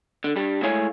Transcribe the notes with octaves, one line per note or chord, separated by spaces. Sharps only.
D3
G2 G3
G#3 A3 E4 C#5 F5 G#5